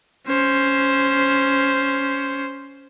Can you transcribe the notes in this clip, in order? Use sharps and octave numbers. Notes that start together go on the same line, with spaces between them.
C#4 C5